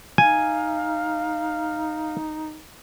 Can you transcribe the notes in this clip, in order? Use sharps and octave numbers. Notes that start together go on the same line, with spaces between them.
D#4 F5 G#5